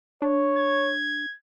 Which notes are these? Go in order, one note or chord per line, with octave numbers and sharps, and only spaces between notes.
D4 C#5
G#6